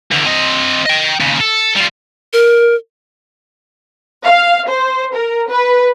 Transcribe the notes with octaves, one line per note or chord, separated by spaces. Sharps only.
E2 D3
C4 D#5
D#5 G5
D#2 C#3
A4
G3 F4
A#4
F5
C5
A#4
B4